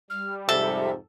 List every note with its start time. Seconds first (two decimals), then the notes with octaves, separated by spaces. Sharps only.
0.10 G3 F6
0.49 F2 G#2 C3 A4 E5